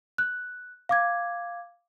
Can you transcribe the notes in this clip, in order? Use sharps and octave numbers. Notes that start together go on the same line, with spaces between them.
F#6
F5 D6 G#6